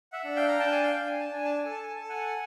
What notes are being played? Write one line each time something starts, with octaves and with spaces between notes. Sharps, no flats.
E5 F#5
D4
F5 G5
A#5
D4 G5 A5
G#5
F5 G5
D4
G#5
A5
D4 G#5
A5
G#5
A4
A5
G#5
A4 A5
F#5 G#5